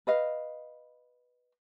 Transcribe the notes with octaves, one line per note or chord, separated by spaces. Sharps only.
B4 D#5 F5